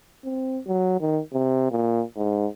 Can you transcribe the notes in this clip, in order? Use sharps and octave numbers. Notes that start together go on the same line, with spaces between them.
C4
F#3
D#3
C3
A#2
G#2